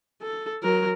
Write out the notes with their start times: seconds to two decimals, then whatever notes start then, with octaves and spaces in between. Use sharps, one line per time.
0.22 A4
0.62 F#3 A#4